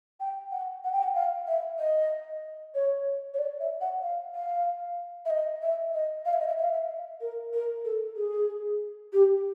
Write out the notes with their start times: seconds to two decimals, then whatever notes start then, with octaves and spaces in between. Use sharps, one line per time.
0.20 G5
0.51 F#5
0.84 F#5
0.92 G5
1.03 F#5
1.15 F5
1.47 E5
1.79 D#5
2.74 C#5
3.34 C#5
3.38 D5
3.60 E5
3.81 F#5
4.02 F5
4.35 F5
5.25 E5
5.30 D#5
5.62 E5
5.94 D#5
6.25 F5
6.33 E5
6.40 D#5
6.47 E5
6.57 E5
6.64 F5
6.72 E5
7.21 A#4
7.53 A#4
7.85 A4
8.17 G#4
9.13 G4